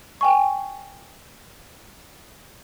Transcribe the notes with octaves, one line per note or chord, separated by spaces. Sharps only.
G5 G#5 C#6